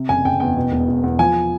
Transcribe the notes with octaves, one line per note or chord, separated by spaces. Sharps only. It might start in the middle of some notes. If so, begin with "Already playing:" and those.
Already playing: C3
F#1 G#5
F#1 G5
E2 G5
B2
E1
E1
E2
F3 G#5